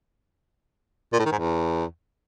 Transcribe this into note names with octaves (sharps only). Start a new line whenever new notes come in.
A#2
A2
D#3
G#2
E2